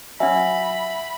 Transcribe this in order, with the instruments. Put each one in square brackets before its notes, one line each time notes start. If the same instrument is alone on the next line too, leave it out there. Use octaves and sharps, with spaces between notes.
[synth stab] F#3 C#4 [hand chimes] E5 [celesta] F#5 G#5 [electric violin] B5